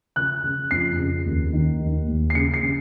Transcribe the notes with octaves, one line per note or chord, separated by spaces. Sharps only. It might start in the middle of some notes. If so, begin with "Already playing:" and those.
C#3 F#6
C#3
F2 C7
C#3
D#2
D#3
D#2
D#2
C7
C#3 C#7
C7
C#3